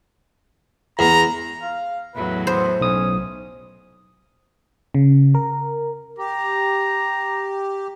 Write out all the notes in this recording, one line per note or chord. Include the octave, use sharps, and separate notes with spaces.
E2 A#5
F5
E2 A2 F#3 B4
B3 C5
B1 C#4 D#6
C#3
A#4
G4 A#5